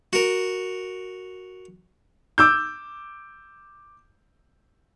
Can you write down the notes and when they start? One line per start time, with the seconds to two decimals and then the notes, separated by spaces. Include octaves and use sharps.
0.13 F#4 A#4
2.38 D6 E6 G6